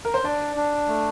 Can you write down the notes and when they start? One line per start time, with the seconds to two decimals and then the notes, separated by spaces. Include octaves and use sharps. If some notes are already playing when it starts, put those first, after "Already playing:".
0.05 A#4
0.14 C5
0.24 D4 D5
0.56 D4
0.88 A3